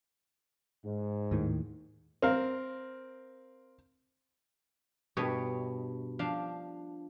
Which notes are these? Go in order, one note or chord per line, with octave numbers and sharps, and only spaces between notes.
G#2
D#2 A2 D#3
C4 A#4 F5
G2 B2 C#5 D#5
F3 D4 F5